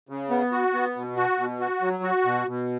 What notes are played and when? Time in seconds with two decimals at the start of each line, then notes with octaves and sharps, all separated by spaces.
0.09 C#3
0.30 B3
0.52 F#4
0.74 B3
0.96 B2
1.16 F#4
1.38 B2
1.60 F#4
1.82 F#3
2.03 F#4
2.25 B2
2.47 B2